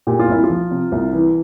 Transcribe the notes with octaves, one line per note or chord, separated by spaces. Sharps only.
A#2 G4
F4
C2 E4
F4
F3
C3
C2
E3